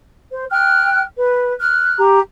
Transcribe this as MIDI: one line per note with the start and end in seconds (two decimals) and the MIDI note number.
0.32 0.44 72
0.50 1.01 79
0.50 1.01 89
0.50 1.01 90
1.17 1.52 71
1.59 1.97 89
1.59 1.97 90
1.98 2.20 67
1.98 2.20 82